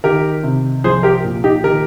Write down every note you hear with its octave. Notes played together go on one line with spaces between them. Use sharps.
D#3 G4 A#4
C3
F3 G#4 C5
G4 A#4
A#2
D#4 G4
D#3 G4 A#4